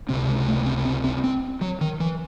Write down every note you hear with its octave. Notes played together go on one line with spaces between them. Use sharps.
C#2 C3 C4
G#3
A3
C4
C4
C4
C4
F#3
D#3
E3